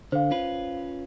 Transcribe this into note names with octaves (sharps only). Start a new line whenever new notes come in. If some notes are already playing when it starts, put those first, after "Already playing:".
D3 C5 F5
C#4 F4 B4